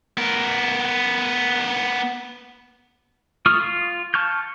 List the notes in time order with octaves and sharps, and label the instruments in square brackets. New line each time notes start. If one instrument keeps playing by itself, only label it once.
[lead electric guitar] B3 A#4
[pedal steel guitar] A3 F4 C#6 D#6 F6
F4
A5 C#6 F6 G6